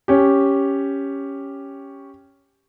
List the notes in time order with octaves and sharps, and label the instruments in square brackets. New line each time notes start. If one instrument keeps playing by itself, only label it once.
[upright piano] C#4 G4